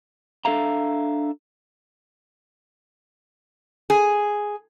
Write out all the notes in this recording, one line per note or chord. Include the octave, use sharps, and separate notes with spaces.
D4 A4 E5 F5 A#5
G#4